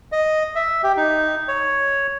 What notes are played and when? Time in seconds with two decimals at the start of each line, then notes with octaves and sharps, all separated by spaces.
0.12 D#5
0.55 E5
0.83 G4
0.97 D#4
1.48 C#5